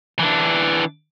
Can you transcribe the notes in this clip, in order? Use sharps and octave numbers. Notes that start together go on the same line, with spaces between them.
E3 D4